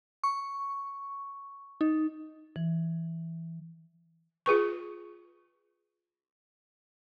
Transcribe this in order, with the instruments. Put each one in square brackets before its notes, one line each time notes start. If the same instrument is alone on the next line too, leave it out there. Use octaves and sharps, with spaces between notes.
[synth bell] C#6
D#4
[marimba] E3
[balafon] F4 G#4 B4 C#6